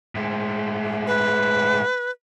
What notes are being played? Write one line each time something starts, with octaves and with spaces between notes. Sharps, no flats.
A2 G#3
B4